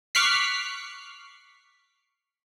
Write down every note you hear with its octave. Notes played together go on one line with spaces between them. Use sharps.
C#6 D6 F6 F#6 B6 C7